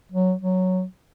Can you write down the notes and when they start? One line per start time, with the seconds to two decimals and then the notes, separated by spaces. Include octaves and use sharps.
0.12 F#3
0.42 F#3